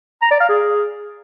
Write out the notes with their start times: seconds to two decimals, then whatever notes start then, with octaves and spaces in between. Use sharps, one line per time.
0.22 A#5
0.31 D5
0.40 F5
0.49 G#4